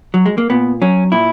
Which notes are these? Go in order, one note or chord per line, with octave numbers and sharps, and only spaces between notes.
F#3
G#3
A#3
A#2 B3
F#3 C#4
A#2 E4